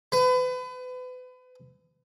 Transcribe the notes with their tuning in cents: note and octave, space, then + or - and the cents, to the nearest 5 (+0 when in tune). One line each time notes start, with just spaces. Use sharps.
B4 +35